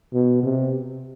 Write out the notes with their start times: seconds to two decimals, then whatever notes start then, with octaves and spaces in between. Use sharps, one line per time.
0.13 B2
0.43 C3